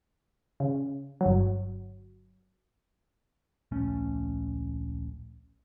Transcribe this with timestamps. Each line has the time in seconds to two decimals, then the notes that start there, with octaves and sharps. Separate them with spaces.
0.60 C#3
1.21 G1 F#3
3.71 D1 A#1 A3 C#4